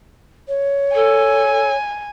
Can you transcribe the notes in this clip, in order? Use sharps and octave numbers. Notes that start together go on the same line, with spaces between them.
C#5
A4 G#5